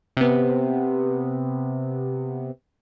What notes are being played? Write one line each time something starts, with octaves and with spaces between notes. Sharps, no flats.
C3 B3